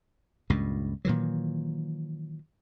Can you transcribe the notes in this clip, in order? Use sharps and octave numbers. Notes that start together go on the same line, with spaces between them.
C#2 G2 A#2
A#2 D#3 E3 F#3